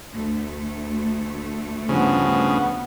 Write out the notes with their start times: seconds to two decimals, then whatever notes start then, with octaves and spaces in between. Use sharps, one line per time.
0.12 D2 A3
1.89 G2 C#3 F3 B3 D4